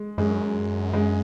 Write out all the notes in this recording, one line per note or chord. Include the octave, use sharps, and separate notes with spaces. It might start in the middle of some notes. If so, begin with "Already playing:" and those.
Already playing: G#3
F#2 G#3
G#3